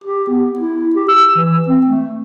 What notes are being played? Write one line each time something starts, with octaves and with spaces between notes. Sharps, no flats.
G4
B3
E4
G4
E6
E3
C4
A3